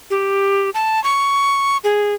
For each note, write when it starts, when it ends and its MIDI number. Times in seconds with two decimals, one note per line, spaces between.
0.10 0.70 67
0.74 1.02 81
1.04 1.77 85
1.84 2.15 68